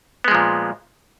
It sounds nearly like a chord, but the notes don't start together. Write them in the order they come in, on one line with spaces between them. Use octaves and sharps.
B3 G#3 F3 A#2